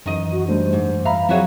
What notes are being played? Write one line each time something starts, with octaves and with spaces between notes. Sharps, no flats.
F#2 D#3 E3 D#5
F#4
G3 A3 D4 C5
G#2
E5 F5 A#5 B5
F3 F#3 C4 E4 F#4 G#4 C#5